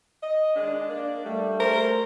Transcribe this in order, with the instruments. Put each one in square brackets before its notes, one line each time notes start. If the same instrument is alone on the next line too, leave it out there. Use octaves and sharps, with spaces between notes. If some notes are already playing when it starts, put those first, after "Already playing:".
[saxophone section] D#5
D#3 G#3 D4
A#3 D4
[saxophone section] G3 [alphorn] A3
[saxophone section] G3 A#3 C5 [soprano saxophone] A#4